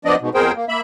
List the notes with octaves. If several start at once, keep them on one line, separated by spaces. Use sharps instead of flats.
F3 B3 D4 D5 D#5
G#2 B2
F2 B3 G#4 A#4 C5 G5
A#3
A#3 E5 B5